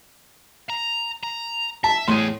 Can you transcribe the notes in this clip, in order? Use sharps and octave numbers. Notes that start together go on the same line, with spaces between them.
A#5
A#5
E5 A5
E2 A2 G#4 C6